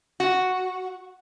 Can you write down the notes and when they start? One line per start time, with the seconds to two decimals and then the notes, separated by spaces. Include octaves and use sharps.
0.20 F#4